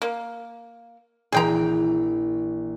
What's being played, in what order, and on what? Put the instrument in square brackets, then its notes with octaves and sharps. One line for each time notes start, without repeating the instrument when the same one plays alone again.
[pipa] A#3
[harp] A#1 E3 [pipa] G#4 G5 A#5